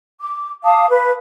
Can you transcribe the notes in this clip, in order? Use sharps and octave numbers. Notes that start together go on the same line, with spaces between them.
D6
F5 A5 D6 D#6
B4